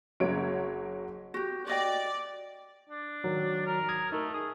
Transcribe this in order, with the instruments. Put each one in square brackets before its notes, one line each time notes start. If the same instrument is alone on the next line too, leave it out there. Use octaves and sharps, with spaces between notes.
[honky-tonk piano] F#1 F#3 C#5 D7
[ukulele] F#4 G4
[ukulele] F#4 D#5 G5 [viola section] D5
[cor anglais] D4
[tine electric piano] D#3 F#3
[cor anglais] A#4
[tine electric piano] A#5 D#6 G#6
[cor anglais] A3 [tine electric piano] D#4 A#4
[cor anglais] G#4 [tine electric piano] D#6